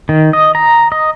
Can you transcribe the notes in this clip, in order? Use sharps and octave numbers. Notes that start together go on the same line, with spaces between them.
D#3
D#5
A#5
D#5